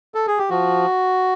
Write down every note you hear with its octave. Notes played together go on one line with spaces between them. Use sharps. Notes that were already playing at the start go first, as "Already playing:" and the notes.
A4
G#4
G4
F3 F#4